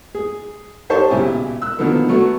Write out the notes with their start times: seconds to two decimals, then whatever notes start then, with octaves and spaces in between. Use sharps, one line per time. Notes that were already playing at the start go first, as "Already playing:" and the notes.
0.15 G#4
0.90 D#4 G4 C5 C#5 A5 C#6
1.10 B1 A#2 C#3 E4 G4 G#5
1.62 E6 F#6
1.79 B2 D3 D#3 F3 A#3 B3
2.08 F#3 A3 B3 F#4